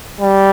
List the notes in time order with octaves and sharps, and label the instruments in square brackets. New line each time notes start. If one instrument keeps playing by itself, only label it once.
[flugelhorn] G3